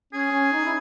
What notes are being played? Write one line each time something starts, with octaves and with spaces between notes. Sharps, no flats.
C#4 G#4
C#4
D#4
E4